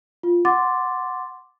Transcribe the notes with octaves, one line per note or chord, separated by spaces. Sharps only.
F4
F#5 C6 D6 A6